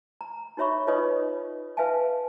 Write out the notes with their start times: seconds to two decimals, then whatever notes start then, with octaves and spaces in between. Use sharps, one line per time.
0.21 A#5
0.57 D#4 F#4 C#5 E5 B5 C#6
0.87 D#4 F4 B4 C#5 D#5 D#6
1.77 B4 E5 F5 G#5 A5